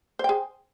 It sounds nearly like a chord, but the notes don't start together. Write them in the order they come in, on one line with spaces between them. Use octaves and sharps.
C5 G5 G#4